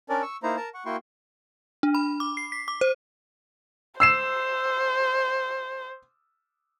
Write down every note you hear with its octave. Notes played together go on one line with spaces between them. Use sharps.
C#4 D4 A#4 D5
C#6 E6
A#3 D#4 E4 C5 A#5
A#4 A5 A#5
F#5 C#6
A#3 E4 F#4 G5 C6 C#6
D4
B5
D6
C7
B6
D6
C5
C5 E6 C7 E7